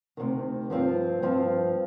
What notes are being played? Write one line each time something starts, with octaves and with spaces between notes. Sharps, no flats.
D2 C3 D#3
G2 F3 C4 F4
G2 F3 C4 F4